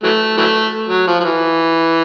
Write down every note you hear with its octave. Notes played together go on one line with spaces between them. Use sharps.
E3 F#3 A3
E3 F#3 A3
F#3
F3
F3
E3